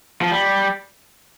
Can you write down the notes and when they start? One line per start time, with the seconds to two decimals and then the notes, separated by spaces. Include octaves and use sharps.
0.21 F3
0.31 G3